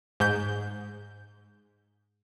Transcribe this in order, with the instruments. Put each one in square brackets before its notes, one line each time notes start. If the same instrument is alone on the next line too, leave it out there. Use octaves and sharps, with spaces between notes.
[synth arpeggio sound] G#2 G6